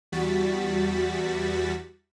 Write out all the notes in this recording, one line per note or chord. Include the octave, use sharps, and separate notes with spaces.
E2 G3 F#4 A6 B6